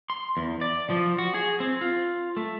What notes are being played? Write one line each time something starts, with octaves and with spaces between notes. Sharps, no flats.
C6
E2
D5
F3
F#4
G#4
C4
F4
A3